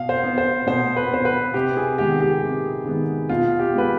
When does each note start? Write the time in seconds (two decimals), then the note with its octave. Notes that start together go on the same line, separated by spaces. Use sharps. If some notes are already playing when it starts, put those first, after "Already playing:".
Already playing: B2 F5
0.09 C5
0.24 B3
0.38 C5
0.67 B2 C5
0.97 B4
1.11 B3 C5
1.25 B4
1.54 C3 G4
1.77 G#4
1.98 D#3 G#3 B3 G4
2.21 G4
2.43 C3
2.85 D#3 G#3 B3
3.29 B2 F4
3.60 G4
3.74 G#3 B3 B4